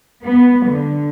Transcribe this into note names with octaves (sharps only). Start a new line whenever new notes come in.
B3
D3